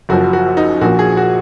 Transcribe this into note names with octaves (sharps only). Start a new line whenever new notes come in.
F#1 F#2 F3 F#4
F#4
D#4
A#1 A#2 F3 F#4
G#4
F#4